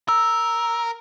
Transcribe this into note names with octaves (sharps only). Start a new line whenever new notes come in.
A#4 E6